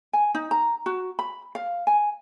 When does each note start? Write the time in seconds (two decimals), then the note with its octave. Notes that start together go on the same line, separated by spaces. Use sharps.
0.13 G#5
0.35 D#4
0.51 A#5
0.86 F#4
1.19 B5
1.55 F5
1.87 G#5